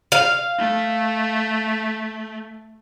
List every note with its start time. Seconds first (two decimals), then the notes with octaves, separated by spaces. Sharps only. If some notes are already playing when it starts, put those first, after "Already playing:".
0.12 F5
0.58 A3